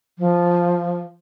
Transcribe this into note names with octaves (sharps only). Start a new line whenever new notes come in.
F3